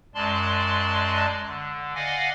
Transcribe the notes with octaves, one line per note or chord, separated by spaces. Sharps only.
F#2 G#3 D5 A5 C6
D3
D5 D#5 F5 F#5 G#5